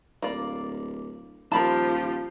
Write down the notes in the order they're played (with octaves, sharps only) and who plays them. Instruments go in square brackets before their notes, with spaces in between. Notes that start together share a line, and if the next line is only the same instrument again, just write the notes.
[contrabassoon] D1 [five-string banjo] A#3 D5
[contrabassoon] D#1 [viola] F3 G4 [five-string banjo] F4 A#4 [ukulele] A5 B5